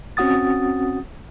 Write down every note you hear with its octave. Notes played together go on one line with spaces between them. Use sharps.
C4 C#4 F#4 F#5 D#6 A6